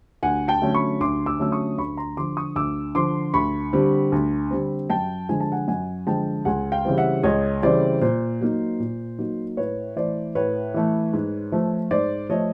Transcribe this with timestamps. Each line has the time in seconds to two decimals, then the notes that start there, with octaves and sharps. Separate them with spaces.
0.23 D2 F#5 G#5
0.48 G5 A5
0.62 D3 F#3 A3 C#4
0.74 B5 C#6
1.01 D2 C6 D6
1.26 D6 E6
1.39 D3 F#3 A3 C#4 E6
1.52 C#6 D#6
1.78 D2 B5 C#6
1.97 A#5 C6
2.17 D3 F3 C6 D6
2.37 C#6 D#6
2.56 D2 D6 E6
2.95 D3 F3 C6 D6
3.34 D2 B5 C#6
3.73 D3 G3 C4
4.12 D2
4.51 D3 G3 C4
4.90 F#2 G5 A5
5.29 D3 F3 G#3 G#5
5.40 A5
5.52 F#5 G#5
5.68 F#2 F#5 G#5
6.07 D3 F3 G#3 G5 A5
6.45 C#2 F#5 G#5
6.72 F5 G5
6.85 C#3 E3 G3 C4
6.98 E5 F#5
7.23 C#2 C#5 D#5
7.63 C#3 E3 G3 C4 C5 D5
8.01 A#2 C5
8.41 F#3 A#3 D#4
8.80 A#2
9.18 F#3 A#3 D#4
9.57 A2 B4 C#5
9.96 E3 A3 C5 D5
10.35 A2 B4 C#5
10.74 E3 A3
11.13 G#2
11.52 F3 A3
11.91 G#2 C5 D5
12.29 F3 A3 C#5 D#5